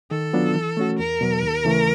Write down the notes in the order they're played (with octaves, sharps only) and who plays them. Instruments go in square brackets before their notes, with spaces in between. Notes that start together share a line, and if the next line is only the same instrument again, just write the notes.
[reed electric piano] D#3 [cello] A4
[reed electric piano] F#3 B3 D4 F4
E3
A3 C#4 F#4
[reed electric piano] E2 [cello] A#4
[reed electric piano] B2 F#3
D#2
C#3 E3 A3